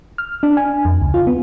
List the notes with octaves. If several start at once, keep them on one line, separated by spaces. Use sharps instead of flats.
F6
D4
G#5
F2
C#2
F4
B3